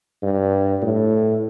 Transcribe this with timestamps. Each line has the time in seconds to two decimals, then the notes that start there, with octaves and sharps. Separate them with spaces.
0.23 G2
0.82 A2